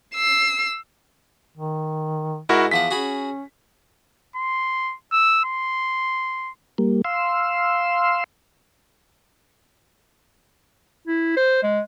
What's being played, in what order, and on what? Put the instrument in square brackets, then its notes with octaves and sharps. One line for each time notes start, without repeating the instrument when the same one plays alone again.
[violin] E6 C7
[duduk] D#3
[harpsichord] G#2 [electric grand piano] E4 F#4 A#4
[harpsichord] E2 F3 F#5 [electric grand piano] B6
[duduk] C#4 [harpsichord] F#4 G#4 B5
[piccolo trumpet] C6
E6
C6
[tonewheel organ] G3 A#3
F5 C6 E6
[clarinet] E4
C5
G#3